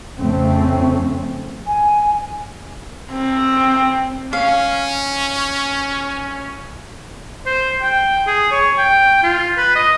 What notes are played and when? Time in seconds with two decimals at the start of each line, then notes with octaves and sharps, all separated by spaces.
0.20 F2 C#3 A3 C4 C#4
1.67 G#5
3.12 C4
4.33 C#4 F5
7.46 C5
7.82 G5
8.27 G#4
8.52 C#5
8.78 G5
9.23 F4
9.58 B4
9.76 D#5